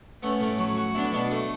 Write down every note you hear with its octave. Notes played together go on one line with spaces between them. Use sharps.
A3 B3 C#4
A2
F#3
F#4
B3 D4 E4
B2
A3